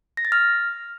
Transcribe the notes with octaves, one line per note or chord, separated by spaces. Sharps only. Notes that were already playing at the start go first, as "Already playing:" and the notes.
A#6
A6
F6